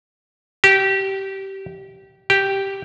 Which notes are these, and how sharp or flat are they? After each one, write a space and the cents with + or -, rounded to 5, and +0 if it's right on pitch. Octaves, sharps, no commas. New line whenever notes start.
G4 -20
G4 -5